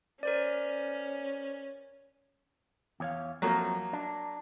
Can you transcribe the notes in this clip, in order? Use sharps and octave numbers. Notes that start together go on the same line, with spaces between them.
C#4 A#4 C5 D5
E2 C#5 F5
F2 F3 F#3 A3 A#3
D4